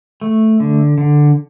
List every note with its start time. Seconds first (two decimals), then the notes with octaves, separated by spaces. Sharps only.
0.21 A3
0.60 D3
0.98 D3